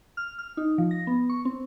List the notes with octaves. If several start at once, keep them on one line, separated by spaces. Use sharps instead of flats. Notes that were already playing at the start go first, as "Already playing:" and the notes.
F6
F6
D#4
F3
A#6
B3
C#6
C4